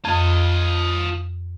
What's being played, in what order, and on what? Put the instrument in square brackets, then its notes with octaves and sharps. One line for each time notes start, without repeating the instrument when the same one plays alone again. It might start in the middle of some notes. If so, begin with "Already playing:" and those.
[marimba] F2 [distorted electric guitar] F4 D#5